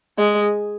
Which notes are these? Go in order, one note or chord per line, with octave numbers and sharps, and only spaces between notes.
G#3